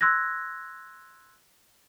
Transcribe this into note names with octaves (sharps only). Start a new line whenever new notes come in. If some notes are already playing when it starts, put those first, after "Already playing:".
C6 E6 F#6 G#6 A#6